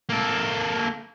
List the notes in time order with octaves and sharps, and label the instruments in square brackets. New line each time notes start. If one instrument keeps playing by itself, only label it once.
[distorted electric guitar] A#3 A4